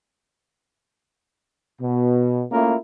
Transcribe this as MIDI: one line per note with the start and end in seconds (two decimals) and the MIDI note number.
1.81 2.44 47
2.52 2.76 57
2.52 2.76 58
2.52 2.76 61
2.52 2.76 64
2.52 2.76 65
2.52 2.76 70